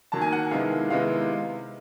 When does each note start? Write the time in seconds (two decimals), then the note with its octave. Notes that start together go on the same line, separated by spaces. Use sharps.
0.12 D#3 F#3 A#3 A5
0.21 G#5
0.32 F#5
0.51 C3 D#3 G#3 B3 E4 F5
0.90 C3 D#3 G#3 B3 E4 F5